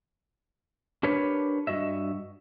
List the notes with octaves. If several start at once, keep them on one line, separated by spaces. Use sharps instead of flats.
D4 G4 A#4 B4 C#5
G2 F#4 D#5 E5